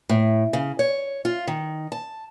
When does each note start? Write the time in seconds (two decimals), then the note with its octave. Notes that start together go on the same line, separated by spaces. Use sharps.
0.09 A2
0.53 C#3
0.79 C#5
1.25 F4
1.47 D#3
1.92 A5